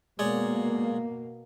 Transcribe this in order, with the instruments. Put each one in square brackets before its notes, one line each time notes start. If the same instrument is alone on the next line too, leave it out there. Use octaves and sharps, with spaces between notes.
[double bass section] B2 A#3 [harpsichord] G#3 C#5 D5